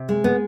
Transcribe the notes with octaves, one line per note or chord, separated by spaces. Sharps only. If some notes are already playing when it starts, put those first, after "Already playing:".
Already playing: C3
G#3
B3